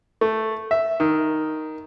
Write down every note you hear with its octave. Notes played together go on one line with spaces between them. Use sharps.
A3
E5
D#3